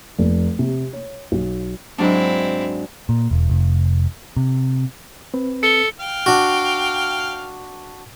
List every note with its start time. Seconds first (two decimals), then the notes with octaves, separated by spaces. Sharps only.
0.18 F1
0.59 C3
0.93 C#5
1.32 B1
1.98 G#2 F#3 C4 D4 E4
3.09 A#2
3.31 E1
3.50 F1
4.37 C3
5.34 C4 B4
5.63 A4 C#7 G7
6.00 F5 G5
6.26 D4 F#4